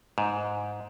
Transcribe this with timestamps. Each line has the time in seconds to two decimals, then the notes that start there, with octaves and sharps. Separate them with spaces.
0.18 G#2